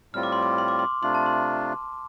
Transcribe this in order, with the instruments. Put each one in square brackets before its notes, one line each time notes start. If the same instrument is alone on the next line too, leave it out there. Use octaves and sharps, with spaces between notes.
[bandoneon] A2 G3 C4 F4 [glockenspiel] F6
[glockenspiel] D6
C6
D6
C6
D6
C6
[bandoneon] C3 A3 D4 F4 [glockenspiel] C6
[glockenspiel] A5
C6